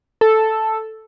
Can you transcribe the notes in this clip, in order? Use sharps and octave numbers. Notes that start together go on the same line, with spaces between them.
A4